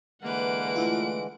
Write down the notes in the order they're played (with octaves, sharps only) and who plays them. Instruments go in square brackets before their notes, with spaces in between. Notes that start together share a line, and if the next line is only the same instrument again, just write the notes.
[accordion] D3 E3 G#3 [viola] A#3 B4 [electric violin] F#5 D7
[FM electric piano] A3 E4 F4